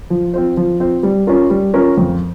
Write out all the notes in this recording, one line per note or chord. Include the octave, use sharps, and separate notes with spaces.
F3
C4 F4 C5
F3
C4 F4 C5
G3
C#4 F4 A#4
G3
C#4 F4 A#4
F2